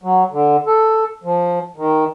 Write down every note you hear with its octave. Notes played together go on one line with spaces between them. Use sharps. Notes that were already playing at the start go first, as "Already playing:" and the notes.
F#3
D3
A4
F3
D#3